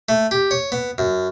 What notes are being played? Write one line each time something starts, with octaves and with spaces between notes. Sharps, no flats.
A3
G4
C#5
B3
F#2